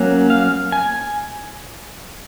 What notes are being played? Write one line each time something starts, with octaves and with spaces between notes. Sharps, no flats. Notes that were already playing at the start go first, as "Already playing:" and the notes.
Already playing: F#3 A#3 C#4
F5
G#5